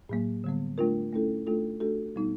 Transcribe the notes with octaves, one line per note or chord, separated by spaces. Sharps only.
A2 F#3 A#3
D3 G3 B3
A3 D4 F4 A#4
A3 C#4 E4 A4
A3 D4 F4 A4
A3 D4 F#4 A4
B2 G3 B3 D#4